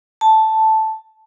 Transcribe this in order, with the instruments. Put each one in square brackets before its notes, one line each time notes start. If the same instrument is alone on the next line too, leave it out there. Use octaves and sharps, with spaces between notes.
[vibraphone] A5